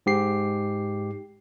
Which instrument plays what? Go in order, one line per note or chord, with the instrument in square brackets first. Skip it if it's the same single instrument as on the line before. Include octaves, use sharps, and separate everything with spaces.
[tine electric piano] G#2 G4 C7